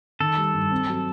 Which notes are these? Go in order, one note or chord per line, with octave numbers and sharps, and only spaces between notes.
D#3 A4
G3
G2
C4
F#3